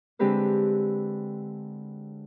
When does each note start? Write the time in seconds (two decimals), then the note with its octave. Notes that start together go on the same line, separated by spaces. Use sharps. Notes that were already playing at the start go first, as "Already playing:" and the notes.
0.19 D3 G#3 C4 G4 B4 C5